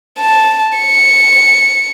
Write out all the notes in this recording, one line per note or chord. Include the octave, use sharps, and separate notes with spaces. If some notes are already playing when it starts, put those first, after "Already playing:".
A5
C#7